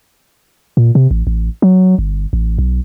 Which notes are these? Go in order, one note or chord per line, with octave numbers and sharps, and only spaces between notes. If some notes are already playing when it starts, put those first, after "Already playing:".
A#2
C3
A1
A1
F#3
G1
A1
B1